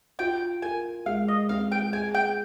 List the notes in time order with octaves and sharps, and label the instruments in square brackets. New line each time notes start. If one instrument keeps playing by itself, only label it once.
[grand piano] F4 [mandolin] G5
[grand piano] A#4 [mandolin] G#5
[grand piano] G#3 [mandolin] F5
[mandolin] D#5
[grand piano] C4 [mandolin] F5
[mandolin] G5
[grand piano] G#4 [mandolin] G#5
[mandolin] G5